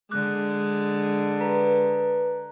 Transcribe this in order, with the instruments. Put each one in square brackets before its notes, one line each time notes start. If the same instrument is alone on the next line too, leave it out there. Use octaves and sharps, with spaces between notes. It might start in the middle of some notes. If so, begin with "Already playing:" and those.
[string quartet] D3 [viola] G#3 [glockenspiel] D6 F#6
[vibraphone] B4 [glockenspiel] A#5